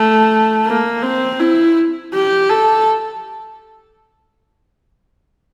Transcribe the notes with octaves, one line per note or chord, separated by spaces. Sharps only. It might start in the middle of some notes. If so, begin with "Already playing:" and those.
Already playing: A3
A#3
C4
E4
G4
A4